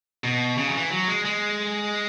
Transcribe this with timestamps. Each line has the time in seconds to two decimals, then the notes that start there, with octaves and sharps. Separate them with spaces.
0.24 B2
0.57 C#3
0.68 F#3
0.74 E3
0.91 F#3
1.08 G#3
1.25 G#3